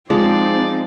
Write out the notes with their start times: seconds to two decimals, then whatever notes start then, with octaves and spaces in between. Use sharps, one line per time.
0.10 F3 G#3 C4 D#4 D5